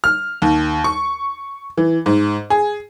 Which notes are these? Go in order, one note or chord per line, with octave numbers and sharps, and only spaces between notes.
F6
D#2
C#6
E3
G#2
G#4